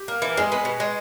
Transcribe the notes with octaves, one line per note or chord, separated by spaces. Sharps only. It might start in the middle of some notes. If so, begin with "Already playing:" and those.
Already playing: G4
A#3
E3
G#3 G#4
B3
B2
G#3